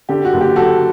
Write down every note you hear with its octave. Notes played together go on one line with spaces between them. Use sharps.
D3 G4
F#4
F#1
G4
F#3 F#4 A4